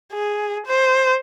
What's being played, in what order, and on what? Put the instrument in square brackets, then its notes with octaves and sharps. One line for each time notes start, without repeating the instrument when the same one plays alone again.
[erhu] G#4
C5